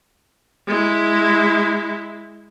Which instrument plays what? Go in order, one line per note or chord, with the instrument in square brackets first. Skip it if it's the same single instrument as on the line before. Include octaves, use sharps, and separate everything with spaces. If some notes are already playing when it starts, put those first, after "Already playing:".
[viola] G#3 E4